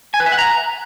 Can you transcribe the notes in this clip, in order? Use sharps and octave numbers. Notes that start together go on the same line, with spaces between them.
G#5
B4
E5
F#5
A#5